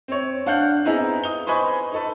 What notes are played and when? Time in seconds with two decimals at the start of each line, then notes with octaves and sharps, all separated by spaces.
0.08 C4 C#5
0.46 D4 F5 F#5 G6 F#7
0.85 B3 C4 D#4 E4 G#4 A#5
1.24 D#6 G7
1.47 B4 C5 D#5 G#5 B5 C#6
1.92 D#4 A4 B4